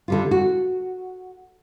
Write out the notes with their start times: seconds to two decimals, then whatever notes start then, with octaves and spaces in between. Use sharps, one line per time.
0.08 D3 G3 F4
0.31 F#4